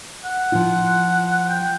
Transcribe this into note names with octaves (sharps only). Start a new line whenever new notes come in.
F#5
F3 F4
G5